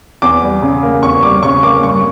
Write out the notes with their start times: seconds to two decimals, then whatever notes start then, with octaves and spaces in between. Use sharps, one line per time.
0.22 E2 D6
0.42 G3
0.62 C#3
0.83 A#3
1.03 E2 C#6
1.23 G3 D6
1.43 C#3 C#6
1.63 A#3 D6
1.83 G2 C#6